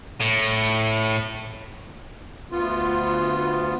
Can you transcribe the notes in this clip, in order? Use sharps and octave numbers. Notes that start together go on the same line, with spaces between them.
A2
D2 B3 F4